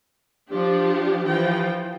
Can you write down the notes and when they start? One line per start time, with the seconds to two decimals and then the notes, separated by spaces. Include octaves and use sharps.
0.49 F3 D4 G4
1.24 E3 F3 G5